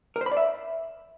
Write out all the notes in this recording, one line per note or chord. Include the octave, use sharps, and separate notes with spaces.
A#4
C5
B5
D5
E5